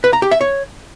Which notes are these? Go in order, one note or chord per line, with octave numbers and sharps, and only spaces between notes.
B4
A#5
G4
E5
C#5